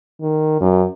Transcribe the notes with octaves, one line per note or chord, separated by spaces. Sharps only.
D#3
F#2